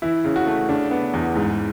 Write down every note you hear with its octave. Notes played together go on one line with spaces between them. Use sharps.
E3 E4
C#3
F#4
A3
C#3 D4
B3
E2
G#2